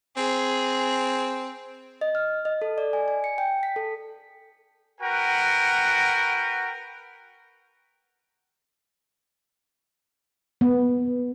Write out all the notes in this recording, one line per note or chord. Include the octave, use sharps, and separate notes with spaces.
C4 G#4
D#5
F6
D#5
A4
D5
G#5
G#5
C#7
G5
B6
A4
F#4 A#4 B4 F#5 G5
B3